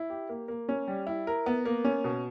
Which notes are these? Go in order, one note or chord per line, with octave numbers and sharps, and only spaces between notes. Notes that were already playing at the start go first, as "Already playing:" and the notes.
Already playing: E4
G4
A#3
A#3
C#4
G3
E4
A#4
B3
A#3
C#4
B2